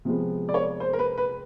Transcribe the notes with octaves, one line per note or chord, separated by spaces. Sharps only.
C3 F3 G#3 B3
D5
C#5
C5
A#4
B4
B4